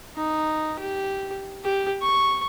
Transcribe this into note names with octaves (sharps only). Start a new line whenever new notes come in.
D#4
G4
G4
C#6